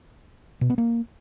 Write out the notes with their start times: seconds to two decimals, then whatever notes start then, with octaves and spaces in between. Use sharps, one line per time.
0.61 B2
0.70 B3
0.78 A#3